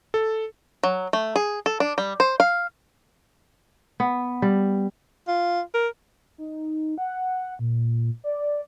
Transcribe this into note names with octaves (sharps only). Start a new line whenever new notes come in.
A4
F#3
A3
G#4
A4
D4
G3
C5
F5
B3
G3
F4
A#4
D#4
F#5
A#2
D5